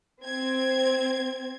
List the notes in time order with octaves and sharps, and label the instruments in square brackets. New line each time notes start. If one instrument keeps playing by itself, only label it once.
[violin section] C4 G#6